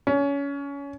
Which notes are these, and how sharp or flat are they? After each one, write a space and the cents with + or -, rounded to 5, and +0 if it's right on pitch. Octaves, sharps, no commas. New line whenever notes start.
C#4 +25